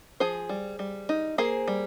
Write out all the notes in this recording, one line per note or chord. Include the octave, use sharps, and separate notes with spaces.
F3 G#4 C5
G3
G3
D#4
A#3 G#4 C5
G3